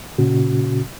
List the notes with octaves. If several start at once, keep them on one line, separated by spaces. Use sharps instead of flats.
A#2 C#3 C#4 F#4